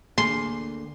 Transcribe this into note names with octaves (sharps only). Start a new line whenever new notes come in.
D2 A#3 G#4 C6